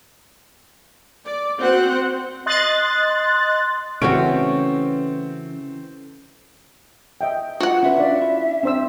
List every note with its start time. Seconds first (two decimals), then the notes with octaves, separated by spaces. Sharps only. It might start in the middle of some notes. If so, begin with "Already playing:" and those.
1.25 D5
1.59 C4 F#4 C5 F#5
2.46 D#5 C6 F#6 A6
4.02 C#3 E3 A3 C4 C#4 F#4 D7
7.21 D#5 E5 G5
7.61 F4 F#4 F#5
7.83 C#4 B4 E5
7.98 D4 D5 F5
8.22 E4
8.63 C4 D4 C5 E6